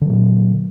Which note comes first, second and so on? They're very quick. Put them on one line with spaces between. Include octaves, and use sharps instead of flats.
D3 F#3 A#2